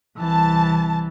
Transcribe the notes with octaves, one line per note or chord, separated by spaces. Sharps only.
C2 E3 A5